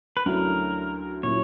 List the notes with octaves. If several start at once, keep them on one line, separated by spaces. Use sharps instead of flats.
B4
D2 D3 F#3 C#4 E4 A#4
A#2 F#3 C#4 E4 C#5